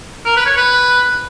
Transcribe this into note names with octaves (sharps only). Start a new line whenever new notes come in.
A#4
B4
C#5
B4